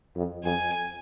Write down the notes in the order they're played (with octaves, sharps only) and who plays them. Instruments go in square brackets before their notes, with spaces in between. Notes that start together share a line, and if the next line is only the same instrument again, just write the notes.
[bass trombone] F2
[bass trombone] F2 [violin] G#5